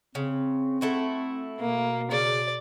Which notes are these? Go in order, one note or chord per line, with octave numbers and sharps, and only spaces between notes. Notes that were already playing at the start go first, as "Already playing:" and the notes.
C#3 C4
A3 E4 F#4
B2 A#3
C#3 D5